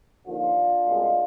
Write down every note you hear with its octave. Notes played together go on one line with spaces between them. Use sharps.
D#2 D3 F3 D4 F4
C2 B2 G#3